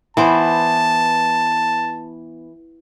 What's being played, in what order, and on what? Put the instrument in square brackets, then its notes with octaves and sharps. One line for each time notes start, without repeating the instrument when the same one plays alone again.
[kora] E3 B3 C5 [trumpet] A5